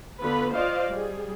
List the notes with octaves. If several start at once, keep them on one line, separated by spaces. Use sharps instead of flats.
D3 B3 F4 B4 B5
F4 C5 D5 D#5 F5
G3 G#4